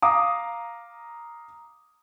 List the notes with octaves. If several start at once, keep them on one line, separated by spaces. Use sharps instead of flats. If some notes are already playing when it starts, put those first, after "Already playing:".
F5 A#5 D6 D#6